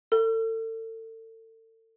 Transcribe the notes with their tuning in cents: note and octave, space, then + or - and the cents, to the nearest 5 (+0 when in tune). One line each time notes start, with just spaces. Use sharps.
A4 +35